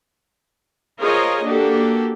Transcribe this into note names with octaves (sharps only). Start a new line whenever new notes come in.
F4 G#4 A#4 C5 C#5 D#5
A#3 D4 F#4 G4 A4